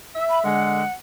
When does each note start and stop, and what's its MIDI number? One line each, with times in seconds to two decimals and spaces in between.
0.15 0.43 76
0.30 0.39 83
0.44 0.82 50
0.44 0.82 56
0.44 0.92 78